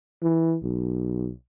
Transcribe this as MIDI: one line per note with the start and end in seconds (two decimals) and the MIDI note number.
0.22 0.56 52
0.63 1.31 35